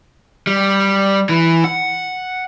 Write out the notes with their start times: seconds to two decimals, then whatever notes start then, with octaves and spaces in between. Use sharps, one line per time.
0.47 G3
1.29 E3
1.64 F#5